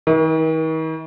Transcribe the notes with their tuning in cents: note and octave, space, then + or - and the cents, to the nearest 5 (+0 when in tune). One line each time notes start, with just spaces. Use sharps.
D#3 +45